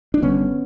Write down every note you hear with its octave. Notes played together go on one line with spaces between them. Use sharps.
D4
G1 G2 D3 B3 C#4